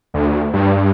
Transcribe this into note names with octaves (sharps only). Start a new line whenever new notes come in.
D2
G2